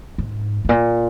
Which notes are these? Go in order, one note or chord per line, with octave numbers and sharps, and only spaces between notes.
G#2
G#2
A#2